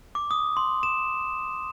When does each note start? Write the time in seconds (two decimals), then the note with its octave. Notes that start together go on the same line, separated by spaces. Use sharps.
0.15 D6
0.31 D#6
0.57 C6
0.83 E7